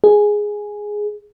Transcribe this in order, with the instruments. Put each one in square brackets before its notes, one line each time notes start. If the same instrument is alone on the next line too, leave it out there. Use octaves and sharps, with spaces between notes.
[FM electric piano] G#4